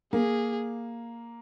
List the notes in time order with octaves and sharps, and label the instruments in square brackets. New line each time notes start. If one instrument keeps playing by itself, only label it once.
[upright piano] A#3 [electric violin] G#4